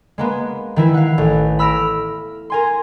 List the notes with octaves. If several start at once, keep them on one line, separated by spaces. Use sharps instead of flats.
G#3 A#3 B3
D#3 E3 E4
F5 F#5
A1
B5 E6 F6 A#6 D7
A#4 G#5 C6